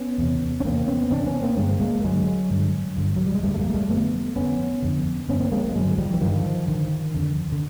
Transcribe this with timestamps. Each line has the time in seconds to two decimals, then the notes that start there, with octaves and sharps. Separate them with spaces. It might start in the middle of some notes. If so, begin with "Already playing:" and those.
Already playing: B3 C#4
0.18 E2 C3
0.60 C#4
0.65 E2 C3 A#3 C4
0.88 B3 C#4
1.11 E2 C3 C4 D4
1.26 B3 C#4
1.42 A#3 C4
1.57 G2 D3 G#3 A#3
1.81 G#3 A#3
2.04 G2 D3 F#3 G#3
2.50 G2 D3
2.97 G2 D3
3.16 F#3
3.26 G3
3.35 G#3
3.43 F2 G3 A3
3.47 D3
3.54 A3
3.58 G#3 A#3
3.69 G#3
3.74 G3 A3
3.89 F2 D3 A3 B3
4.36 F2 D3 B3 C#4
4.82 F2 D3
5.28 G2 D3 B3 C#4
5.40 A#3 C4
5.52 G#3 A#3
5.64 G#3 A#3
5.75 G2 D3 F#3 G#3
5.98 F3 G3
6.14 E3
6.21 G2 D3 D#3 F3
6.68 G2 D3 D#3
7.14 F2 D3
7.52 D3